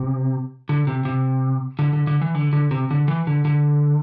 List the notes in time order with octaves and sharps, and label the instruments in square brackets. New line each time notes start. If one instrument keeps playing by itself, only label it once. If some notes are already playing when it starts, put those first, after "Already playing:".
Already playing: [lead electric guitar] C3
D3
C3
C3
D3
D3
D3
E3
D3
D3
C3
D3
E3
D3
D3